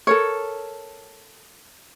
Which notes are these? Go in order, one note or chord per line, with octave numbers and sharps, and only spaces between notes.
A4 A#4 C#5